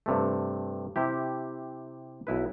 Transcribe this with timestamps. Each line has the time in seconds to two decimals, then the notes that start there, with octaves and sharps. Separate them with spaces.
0.06 G2 C3 A3
0.96 C3 E4 G4
2.27 B1 E4 B4